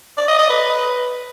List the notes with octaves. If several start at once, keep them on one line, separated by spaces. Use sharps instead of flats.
D5
D#5
D#5
B4